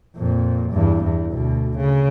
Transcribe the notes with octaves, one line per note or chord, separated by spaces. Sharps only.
F2 A#2
E2 G2
E2
D2 B2
C#3